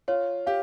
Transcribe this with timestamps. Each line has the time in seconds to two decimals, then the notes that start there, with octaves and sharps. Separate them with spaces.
0.08 F4 C#5
0.47 G4 F5